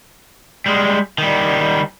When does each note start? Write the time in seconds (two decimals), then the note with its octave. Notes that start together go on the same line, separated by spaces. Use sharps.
0.66 G3 G#3
1.18 D#3 G3